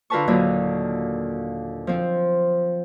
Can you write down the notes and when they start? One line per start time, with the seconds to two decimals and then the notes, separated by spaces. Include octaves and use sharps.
0.10 D3 F4 A#4 B4 A5 C#6
0.27 D#2 A#2 D3 F#3
1.87 F3 C4